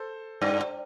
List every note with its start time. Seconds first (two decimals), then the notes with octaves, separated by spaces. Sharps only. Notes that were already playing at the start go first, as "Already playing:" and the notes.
Already playing: A4 C5
0.42 G2